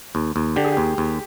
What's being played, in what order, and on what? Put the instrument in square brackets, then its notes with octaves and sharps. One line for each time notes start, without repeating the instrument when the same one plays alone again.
[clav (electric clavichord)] D#2
D#2
[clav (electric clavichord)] D3 [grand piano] G4
[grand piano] G#4
[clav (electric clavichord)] D#2 [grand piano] G4
[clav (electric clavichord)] D#2